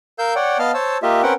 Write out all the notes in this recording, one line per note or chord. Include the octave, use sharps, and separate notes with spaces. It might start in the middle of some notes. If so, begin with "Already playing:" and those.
A#4 F5 E6 G6
C#5 D5 F#5 G5
B3 D#5 F5 A5 F6
C5 C#5 A5 E6
A#3 F4 G4 D#5 E5
C4 C#4 A#4 B4 F#5 G5